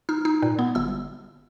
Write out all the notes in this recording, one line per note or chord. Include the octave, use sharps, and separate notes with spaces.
D#4 F6
D#4
A#2
B3
G1 E6